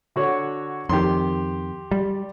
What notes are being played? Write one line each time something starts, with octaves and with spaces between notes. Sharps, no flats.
D3 F#4 C#5
F2 D#3 G4 C6
G3